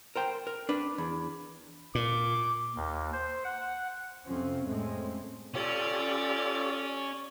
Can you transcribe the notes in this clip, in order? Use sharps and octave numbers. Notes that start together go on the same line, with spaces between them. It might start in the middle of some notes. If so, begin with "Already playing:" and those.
A#4 C5 G5
A#4
D4 B4
E2
A#2 D6
D#2
C5
F#5
F2 C3 F3 C4 C#4
F2 A2 G#3 A3 C4 C#4
C#4 F4 G4 A4 D5